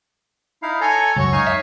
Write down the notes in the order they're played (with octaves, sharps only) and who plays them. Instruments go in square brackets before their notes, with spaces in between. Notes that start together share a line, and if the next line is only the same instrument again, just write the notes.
[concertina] D#4 E4 F5
[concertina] A4 C#5 A#5 [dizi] G#5
[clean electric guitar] C#2 F#2 [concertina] F#4 [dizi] C#5
[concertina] D#4 F5 G#5
[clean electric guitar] E5